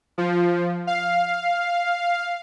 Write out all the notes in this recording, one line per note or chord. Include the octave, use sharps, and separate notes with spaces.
F3
F5